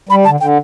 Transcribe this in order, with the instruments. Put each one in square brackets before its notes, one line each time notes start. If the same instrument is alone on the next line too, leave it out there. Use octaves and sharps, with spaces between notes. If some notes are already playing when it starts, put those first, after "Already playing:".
[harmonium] G3 [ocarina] B5
[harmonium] D3 [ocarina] A5
[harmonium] D3 [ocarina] G5